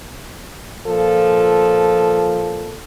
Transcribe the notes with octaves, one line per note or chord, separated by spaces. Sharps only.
A#2 F3 A4